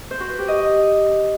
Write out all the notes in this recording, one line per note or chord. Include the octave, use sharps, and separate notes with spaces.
C5
F#4
B4
G4
D#5